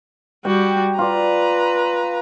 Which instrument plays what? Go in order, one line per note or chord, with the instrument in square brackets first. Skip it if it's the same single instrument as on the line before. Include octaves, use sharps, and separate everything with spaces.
[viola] G3 F#4 [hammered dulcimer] G5
[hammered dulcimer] F4 D5 [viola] B4 A#5